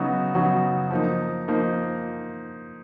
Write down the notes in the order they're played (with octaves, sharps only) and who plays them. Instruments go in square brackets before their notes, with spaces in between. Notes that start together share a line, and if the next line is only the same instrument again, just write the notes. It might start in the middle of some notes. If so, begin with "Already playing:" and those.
Already playing: [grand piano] C#3 F#3 B3 D#4 F#4
C#3 F#3 B3 D#4 F#4
F3 A#3 D#4
F3 A#3 D#4